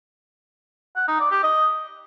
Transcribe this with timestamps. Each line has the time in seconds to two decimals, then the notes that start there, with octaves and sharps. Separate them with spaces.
0.96 F#5
1.08 D#4
1.20 D5
1.32 G4
1.43 D#5